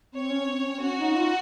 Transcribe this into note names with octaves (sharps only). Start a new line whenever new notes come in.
C4 C#5
C#4
C4
C#4
C4
C#4 F#4
D#4
F4